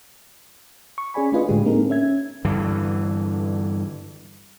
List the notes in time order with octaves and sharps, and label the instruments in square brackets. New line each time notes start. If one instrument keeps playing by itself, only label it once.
[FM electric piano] C#6
C#4 G#4 D5 G#5 B5
A3 D4 F4 B4 D#5
A2 D3 G#3 G4 G#4
A#3 C4 D4 D#4 A4 A#4
C#4 E5 G#6
[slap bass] G2 D3 E3